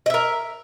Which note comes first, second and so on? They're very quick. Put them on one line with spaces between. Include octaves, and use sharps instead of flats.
D#5 E5 A#4